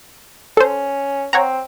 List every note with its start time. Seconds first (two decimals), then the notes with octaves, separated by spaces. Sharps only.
0.57 C#4 A4 C5
1.33 C4 C#5 F#5 A#5